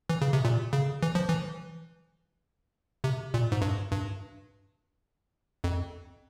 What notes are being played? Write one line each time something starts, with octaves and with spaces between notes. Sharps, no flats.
E3
C#3
C3
A#2
C#3
E3
F3
E3
C3
A#2
G#2
G2
G2
F2